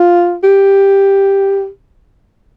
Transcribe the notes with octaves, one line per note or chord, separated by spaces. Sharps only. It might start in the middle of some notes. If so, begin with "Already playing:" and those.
Already playing: F4
G4